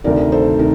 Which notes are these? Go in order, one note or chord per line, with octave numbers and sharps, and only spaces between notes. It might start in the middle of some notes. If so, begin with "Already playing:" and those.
D2 C3 D#3 A#4 D5
A4 C5
C3 D#3 A#4